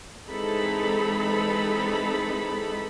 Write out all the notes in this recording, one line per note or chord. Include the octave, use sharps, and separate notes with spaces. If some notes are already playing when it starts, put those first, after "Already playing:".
E3 G#3 C4 D#4 A4 B5